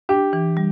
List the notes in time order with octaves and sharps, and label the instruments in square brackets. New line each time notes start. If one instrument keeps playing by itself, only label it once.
[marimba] D4 [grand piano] G4
[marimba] E3
G3